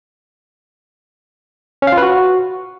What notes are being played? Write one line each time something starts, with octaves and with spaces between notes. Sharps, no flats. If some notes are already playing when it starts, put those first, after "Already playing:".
C#4
F5
F4
B4
F#4